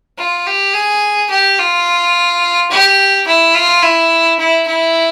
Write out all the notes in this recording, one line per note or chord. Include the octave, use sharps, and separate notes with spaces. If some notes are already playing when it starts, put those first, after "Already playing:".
F4
G4
G#4
G4
F4
G4
E4
F4
E4
E4
E4